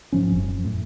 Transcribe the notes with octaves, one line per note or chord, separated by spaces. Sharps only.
G#2 F3 C#4
F1 F#2
A2